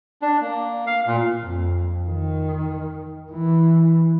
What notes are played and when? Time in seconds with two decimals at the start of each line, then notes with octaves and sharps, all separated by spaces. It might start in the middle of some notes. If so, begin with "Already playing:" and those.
0.22 D4
0.41 A#3
0.87 F5
1.07 A#2
1.42 F2
2.07 D#3
3.31 E3